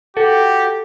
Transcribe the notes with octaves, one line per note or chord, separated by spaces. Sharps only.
F#4 G4 A4